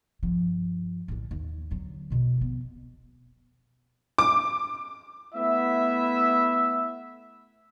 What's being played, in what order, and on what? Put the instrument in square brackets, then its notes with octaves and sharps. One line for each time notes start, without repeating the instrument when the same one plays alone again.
[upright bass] G2 F3
A1 D3
D#2
D3 F#3
E2 B2
F2 B3
[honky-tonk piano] D6
[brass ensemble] A3 B3 E4 E5